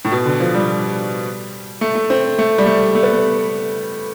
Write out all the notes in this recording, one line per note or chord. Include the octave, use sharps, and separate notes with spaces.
A2
B2
D3
F3
G3
A3
A3
C4
A3
G3
A3
A3
B3
A3